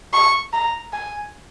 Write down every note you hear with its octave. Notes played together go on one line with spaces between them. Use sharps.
C#6
A#5
G#5